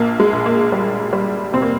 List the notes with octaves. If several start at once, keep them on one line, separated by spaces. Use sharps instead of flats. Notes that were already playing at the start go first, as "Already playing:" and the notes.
Already playing: A#1 A#3
G#3
A#1
A#3
G3
G3
F1 C4
A#3